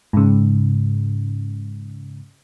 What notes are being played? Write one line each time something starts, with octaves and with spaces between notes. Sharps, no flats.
G#2 C#3